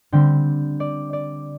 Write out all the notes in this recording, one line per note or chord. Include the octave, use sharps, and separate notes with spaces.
D3 G3 C4 G5
D5
D5